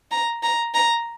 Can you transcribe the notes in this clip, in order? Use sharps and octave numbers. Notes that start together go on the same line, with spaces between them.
A#5
A#5
A#5